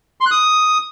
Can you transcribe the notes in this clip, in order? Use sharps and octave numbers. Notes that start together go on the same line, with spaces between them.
C6
F#6
D#6